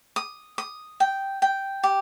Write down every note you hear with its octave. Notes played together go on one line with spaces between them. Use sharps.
D#6
D#6
G5
G5
G4